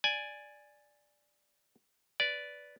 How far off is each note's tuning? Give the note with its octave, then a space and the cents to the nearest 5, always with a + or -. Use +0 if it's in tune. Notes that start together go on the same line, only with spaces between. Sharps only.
D5 +0 G#5 +0
B4 +0 D5 -15